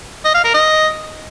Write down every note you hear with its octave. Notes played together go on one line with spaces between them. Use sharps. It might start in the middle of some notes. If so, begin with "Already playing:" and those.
D#5
F5
A#4
D#5